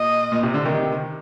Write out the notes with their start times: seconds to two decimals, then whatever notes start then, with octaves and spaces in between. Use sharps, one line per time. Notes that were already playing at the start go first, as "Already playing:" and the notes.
Already playing: A#2 D#5
0.32 A#2
0.43 C3
0.54 D3
0.65 C3 D#3